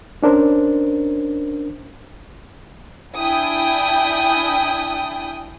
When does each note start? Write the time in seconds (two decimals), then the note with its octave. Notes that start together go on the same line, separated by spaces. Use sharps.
0.23 C#4 D4 A#4 C5
3.15 D4 E4 G5 G#5 D#6